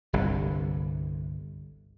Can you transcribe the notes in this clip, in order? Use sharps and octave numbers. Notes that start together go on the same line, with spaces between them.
G1 C2 D3